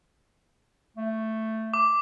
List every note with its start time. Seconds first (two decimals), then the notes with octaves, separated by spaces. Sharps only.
0.97 A3
1.74 D6